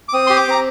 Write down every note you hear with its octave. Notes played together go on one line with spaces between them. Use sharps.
D6
C4 D#6
G4 C6
D6
C4 A#5